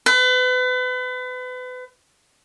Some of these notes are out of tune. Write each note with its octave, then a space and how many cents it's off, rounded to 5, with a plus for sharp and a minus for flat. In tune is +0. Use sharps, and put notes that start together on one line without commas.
B4 +35